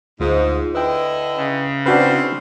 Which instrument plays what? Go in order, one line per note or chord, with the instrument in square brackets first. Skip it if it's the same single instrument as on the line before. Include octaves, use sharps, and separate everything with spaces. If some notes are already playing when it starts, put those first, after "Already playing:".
[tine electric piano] D2 F4 C5 [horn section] G#2
[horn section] D3 E4 D#5 [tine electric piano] B4 G5
[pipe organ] C#3
[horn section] C4 E4 [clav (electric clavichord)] D4 F#4 B4 [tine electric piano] F6